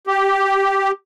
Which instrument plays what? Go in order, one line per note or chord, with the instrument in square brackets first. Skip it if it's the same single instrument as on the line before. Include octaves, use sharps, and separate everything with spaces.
[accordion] G4